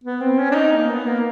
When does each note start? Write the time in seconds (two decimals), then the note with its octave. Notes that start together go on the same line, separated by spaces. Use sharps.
0.04 B3
0.21 C4
0.39 C#4
0.51 D4
0.55 D#4
0.73 A#3
0.90 B3
1.07 A#3